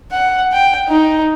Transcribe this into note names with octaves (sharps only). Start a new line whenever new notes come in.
F#5
G5
D#4